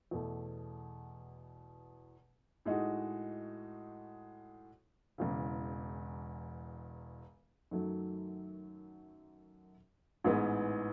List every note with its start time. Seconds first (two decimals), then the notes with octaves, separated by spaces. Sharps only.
0.11 E2 B2 A3
2.65 A2 G#3 D#4 F#4
5.18 E1 E2 C#3
7.71 F#2 D#3 F#3 A3
10.24 A1 G#2 E3 G#3 B3